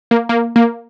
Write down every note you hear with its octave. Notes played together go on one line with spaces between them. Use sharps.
A#3
A#3
A#3